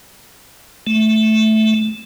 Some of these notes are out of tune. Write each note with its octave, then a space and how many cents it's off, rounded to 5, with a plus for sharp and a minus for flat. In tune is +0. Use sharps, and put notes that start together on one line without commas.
A3 -10